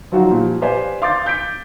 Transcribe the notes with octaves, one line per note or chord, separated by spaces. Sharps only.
F3 F#3 D#4 F#4 F5
A#2 F3 G3
G4 B4 C5 D5 F5 G#5
F5 C6 D6 G6 A6
G6 B6 D7